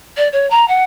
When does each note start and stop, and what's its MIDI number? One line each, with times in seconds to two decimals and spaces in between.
0.17 0.28 74
0.32 0.48 73
0.50 0.67 82
0.68 0.83 78